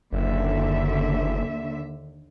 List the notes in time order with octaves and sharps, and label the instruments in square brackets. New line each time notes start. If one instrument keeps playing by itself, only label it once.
[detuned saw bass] F#1 [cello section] D#2 D3 E5